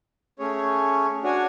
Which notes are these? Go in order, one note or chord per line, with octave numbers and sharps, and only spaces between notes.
A3 C#4 G#4 C#5
D4 F#4 C#5 G#5